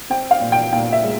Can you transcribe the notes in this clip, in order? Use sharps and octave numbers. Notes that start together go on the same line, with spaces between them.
C4 G5
F5
A#2
G5
A#2 G5
E5
G#3